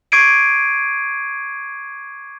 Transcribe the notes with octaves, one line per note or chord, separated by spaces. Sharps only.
C#6 D6 G#6 C7 D7 D#7